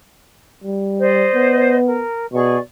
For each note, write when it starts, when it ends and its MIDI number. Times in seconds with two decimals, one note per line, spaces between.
0.64 1.29 55
0.98 1.75 72
0.98 1.75 74
0.98 1.75 75
1.35 2.04 59
1.85 2.25 70
2.33 2.59 47
2.33 2.56 68
2.33 2.56 74
2.33 2.56 85